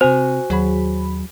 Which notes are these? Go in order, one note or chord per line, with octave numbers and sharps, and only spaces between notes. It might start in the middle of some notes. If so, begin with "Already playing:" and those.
C3 C4 F#4 C5 G#5
D#2 F#3 G#4 B5